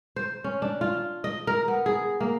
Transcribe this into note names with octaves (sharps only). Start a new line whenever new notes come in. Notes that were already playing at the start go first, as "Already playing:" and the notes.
C5
C#4
D4
F4
D#5
A#4
B3
G#4
A#3